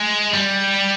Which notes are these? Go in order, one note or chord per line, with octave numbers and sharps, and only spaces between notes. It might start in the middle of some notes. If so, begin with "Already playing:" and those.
Already playing: G#3
G3